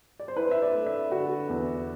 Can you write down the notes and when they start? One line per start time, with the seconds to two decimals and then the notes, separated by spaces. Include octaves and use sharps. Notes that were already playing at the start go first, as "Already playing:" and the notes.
0.20 D5
0.28 C5
0.36 E4 B4
0.51 E5
0.62 D5
0.74 A3
0.86 E5
1.12 D3 F#4
1.49 E2